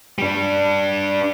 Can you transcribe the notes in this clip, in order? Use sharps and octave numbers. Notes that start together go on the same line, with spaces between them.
G3 D4